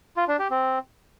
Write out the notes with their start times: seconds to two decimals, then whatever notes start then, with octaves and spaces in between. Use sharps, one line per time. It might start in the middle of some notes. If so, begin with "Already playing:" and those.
0.17 F4
0.28 D4
0.39 G4
0.50 C4